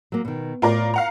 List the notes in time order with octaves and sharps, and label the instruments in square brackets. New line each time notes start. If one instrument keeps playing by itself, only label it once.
[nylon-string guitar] F#3 A#3
B2 D#3
[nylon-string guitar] A2 [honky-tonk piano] F4 A#4 D5
[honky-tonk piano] F5 F#5 A#5